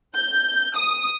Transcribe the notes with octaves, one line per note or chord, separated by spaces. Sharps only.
G6
D#6